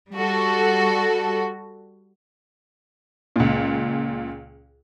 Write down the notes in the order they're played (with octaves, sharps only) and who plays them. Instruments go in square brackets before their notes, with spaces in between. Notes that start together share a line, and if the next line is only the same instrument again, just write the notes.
[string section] G3 F#4 A4
[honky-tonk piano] C#2 A#2